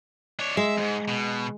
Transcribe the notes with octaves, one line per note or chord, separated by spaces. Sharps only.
D4 C#5
G#3 E5
F2 G#2
B2